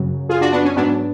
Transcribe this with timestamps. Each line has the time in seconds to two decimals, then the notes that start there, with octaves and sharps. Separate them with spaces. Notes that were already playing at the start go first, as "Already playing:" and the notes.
Already playing: F#2 C#3 F#3
0.29 F4 G#4
0.41 D4 F#4
0.52 B3 D4
0.64 C#4
0.76 G#2 F#3 B3 D4